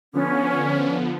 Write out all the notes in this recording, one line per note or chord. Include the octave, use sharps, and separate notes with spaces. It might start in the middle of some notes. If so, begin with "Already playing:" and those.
D3 F3 B3 C#4